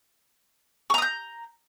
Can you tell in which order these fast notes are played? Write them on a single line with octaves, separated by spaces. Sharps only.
C#6 A#5 D#6 G6